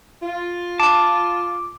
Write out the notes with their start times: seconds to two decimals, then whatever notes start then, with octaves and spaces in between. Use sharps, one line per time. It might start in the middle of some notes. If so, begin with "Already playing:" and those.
0.21 F4
0.80 A5 D6